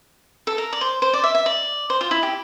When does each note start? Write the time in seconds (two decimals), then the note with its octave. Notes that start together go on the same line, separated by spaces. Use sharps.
0.47 A4
0.58 A#4
0.73 D5
0.81 C5
1.02 C5
1.13 D5
1.23 E5
1.35 E5
1.46 D5
1.90 C5
2.01 F4
2.11 E4
2.23 G4